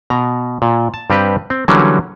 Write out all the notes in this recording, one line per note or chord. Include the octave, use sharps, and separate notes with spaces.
B2 A#5
A#2
A5
G2 G3 C4 G4 B4
C4
D3 E3 F#3 G3 A#3 C#4